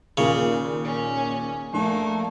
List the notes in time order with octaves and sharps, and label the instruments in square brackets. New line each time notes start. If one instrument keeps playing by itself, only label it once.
[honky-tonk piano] D#2 A#2 A#3 [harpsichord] C#3
[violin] C#4
[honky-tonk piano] A#1 [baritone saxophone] A3 [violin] A#3